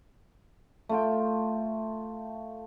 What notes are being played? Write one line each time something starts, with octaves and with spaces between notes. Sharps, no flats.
A3 F4 G5